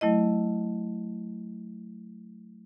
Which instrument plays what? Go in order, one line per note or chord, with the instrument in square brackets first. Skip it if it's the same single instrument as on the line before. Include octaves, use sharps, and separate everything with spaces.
[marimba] F#3 A3 E4 D#5